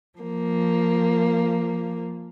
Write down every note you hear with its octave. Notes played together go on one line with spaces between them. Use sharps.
F3 A#3